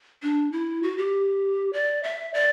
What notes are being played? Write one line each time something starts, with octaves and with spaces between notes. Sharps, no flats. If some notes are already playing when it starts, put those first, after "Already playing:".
D4
E4
F#4
G4
D5
E5
D5